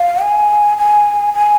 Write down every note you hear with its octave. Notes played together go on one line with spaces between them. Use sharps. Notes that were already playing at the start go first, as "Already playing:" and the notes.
Already playing: F5
G#5
G#5
G#5